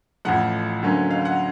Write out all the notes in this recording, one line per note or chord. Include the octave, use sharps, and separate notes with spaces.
A1 A2 F3 F#5
D2 D3 F#3 A#3 C#4
F5
F#5